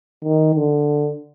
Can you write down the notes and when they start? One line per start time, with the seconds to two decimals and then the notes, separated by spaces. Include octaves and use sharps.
0.24 D#3
0.55 D3